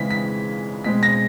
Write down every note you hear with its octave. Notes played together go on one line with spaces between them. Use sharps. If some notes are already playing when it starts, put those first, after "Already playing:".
Already playing: C#3 E3 G#3 C4 B6
B6
B2 G#3 C4 B6
A#6